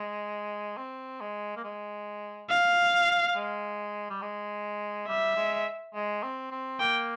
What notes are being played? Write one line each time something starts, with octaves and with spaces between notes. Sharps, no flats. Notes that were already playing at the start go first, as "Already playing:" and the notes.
Already playing: G#3
C4
G#3
A#3
G#3
F5
G#3
G3
G#3
G3 E5
G#3
G#3
C4
C4
A#3 G5